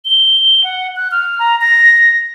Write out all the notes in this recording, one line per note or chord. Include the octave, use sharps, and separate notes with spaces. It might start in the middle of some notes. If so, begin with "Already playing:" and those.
G7
F#5
F#6
F6
A#5
A#6